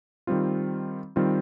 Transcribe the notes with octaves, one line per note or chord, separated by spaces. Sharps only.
D#3 G3 C4 F4
D#3 G3 C4 F4